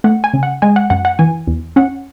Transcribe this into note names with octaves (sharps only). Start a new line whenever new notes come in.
A3 F#5
G#5
C#3
F#5
G#3 G#5
F#5
F#2 F#5
F#5
E3 G#5
E2
C#4 F#5